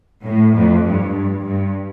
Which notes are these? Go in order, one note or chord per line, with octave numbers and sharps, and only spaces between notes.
A2
F2
G2
G2
G2